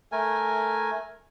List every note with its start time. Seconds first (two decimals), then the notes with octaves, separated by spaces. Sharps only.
0.12 A3 A#4 G#5